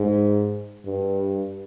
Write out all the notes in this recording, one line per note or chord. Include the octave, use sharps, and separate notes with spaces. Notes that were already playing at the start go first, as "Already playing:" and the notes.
Already playing: G#2
G2